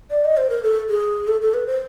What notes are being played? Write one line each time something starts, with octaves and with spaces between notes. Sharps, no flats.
D5
D#5
C5
A#4
A4
G#4
A4
A4
B4
C5